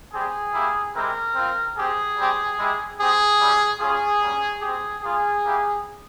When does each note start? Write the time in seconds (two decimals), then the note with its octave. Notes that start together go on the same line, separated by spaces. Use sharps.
0.13 G3 C4 G4 G#4
0.53 A#3 E4 G4
0.94 G#3 C4 E4 G4 A#4
1.35 C4 F4
1.76 C4 G4 G#4
2.17 G3 C4 G4
2.57 G#3 E4 G4
2.99 C4 G4 G#4
3.39 G3 C#4 E4 G4
3.80 G3 C#4 F4 G#4
4.21 G3 A#3 C#4
4.62 C4 G4 G#4
5.02 A#3 F4 G#4
5.43 A#3 E4 G4